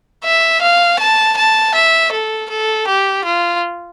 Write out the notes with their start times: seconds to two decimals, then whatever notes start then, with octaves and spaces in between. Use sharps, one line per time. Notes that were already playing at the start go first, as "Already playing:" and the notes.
0.24 E5
0.62 F5
0.99 A5
1.37 A5
1.75 E5
2.12 A4
2.50 A4
2.88 G4
3.25 F4